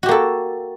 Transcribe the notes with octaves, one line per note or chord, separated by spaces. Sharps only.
A#3 F#4 G4 A4